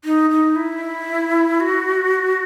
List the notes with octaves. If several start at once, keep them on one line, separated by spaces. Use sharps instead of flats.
D#4
D#4
E4
F#4